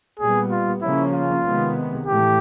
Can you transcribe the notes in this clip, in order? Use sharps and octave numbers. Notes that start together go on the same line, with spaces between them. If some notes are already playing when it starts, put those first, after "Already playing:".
A#2 G3 B3 G#4
F4
C#3 F3 A#3 C#4 E4
F4
C3 D#3 G#3 B3
A2 E3 A3 G4